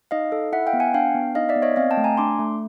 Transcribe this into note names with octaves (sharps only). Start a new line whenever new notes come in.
D#4 D#5 F5
A4
E4 E5 F#5
F5 G5
B3
F#5 G#5
D4 F5 G5
B3
D#4 D#5 F5
D5 E5
B3
C#5 D#5
C4 D#5 F5
G5 A5
A3
G#5 A#5
D4 C6 D6
A3